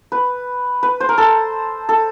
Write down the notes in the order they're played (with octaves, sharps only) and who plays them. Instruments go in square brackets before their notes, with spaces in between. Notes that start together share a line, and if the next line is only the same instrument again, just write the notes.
[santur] B4
B4
C5
A#4
A4
A4